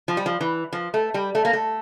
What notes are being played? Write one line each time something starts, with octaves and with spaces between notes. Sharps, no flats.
F3
G3
F3
E3
F3
A3
G3
A3
A#3
A3